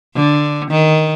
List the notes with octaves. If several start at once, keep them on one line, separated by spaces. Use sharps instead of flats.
D3
D#3